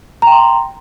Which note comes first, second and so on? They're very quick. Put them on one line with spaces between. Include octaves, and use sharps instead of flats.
A#5 G5 C6